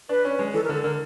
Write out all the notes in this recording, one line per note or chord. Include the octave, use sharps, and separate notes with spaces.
D4 B4
C#4
G#3
E3 A4
A#4
D3 A4
D3 A#4